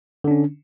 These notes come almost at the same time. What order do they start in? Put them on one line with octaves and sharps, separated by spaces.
D3 D4 C#4